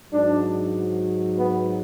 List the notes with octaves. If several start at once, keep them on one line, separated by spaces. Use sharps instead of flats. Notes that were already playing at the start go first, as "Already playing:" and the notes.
G#2 F#3 D4
B3